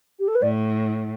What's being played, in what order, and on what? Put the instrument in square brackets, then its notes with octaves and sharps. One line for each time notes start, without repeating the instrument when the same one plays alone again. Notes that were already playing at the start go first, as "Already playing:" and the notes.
[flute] G4
A4
B4
[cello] A2 [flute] D5